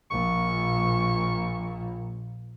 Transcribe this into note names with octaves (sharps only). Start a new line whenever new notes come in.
A#1 A#2 C#6